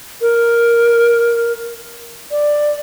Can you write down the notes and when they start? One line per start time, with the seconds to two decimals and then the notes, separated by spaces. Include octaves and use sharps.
0.22 A#4
2.31 D5